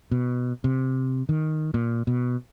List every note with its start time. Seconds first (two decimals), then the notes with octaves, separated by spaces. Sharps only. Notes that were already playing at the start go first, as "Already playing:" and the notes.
0.12 B2
0.64 C3
1.29 D#3
1.74 A#2
2.07 B2